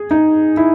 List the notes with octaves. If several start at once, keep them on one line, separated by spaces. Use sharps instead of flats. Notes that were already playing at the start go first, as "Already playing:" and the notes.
Already playing: G#4
D#4
E4